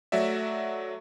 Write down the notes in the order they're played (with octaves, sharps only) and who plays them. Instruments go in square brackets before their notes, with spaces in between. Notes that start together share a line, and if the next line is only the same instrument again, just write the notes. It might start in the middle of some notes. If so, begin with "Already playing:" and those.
[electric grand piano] F#3 A3 F#4 D5 E5